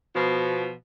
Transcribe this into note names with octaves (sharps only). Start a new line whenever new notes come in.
B2 F3